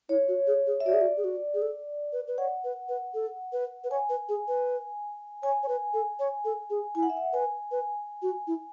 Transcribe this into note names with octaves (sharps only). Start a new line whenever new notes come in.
E4 C#5
F#4
G#4
G#4
E5
F#4 D5
G#4
F#4
G#4
F#4
G#4
A4
B4
B4
C#5 F#5
B4
B4
A4
B4
B4
C#5 G#5
B4
G#4
B4
C#5 G#5
C#5
B4
A4
C#5
A4
G#4
E4 G#5
F#5
E5
F#5
B4 G#5
B4
F#4
E4